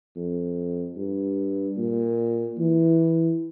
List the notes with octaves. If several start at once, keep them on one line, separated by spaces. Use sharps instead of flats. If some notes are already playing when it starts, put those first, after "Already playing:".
F2
G2
A#2
E3